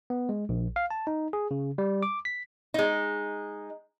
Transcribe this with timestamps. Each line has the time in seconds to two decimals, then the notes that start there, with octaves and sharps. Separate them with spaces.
0.10 B3
0.29 G#3
0.49 A#1
0.76 F5
0.91 A5
1.07 D#4
1.33 G#4
1.51 C#3
1.78 G3
2.03 D6
2.25 B6
2.74 G#3 D#4